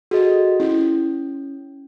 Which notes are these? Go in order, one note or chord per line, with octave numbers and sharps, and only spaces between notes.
F#4 G#4 A4 D#5
C#4 E4